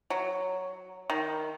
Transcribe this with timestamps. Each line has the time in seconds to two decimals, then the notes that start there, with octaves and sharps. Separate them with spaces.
0.10 F#3
1.10 D#3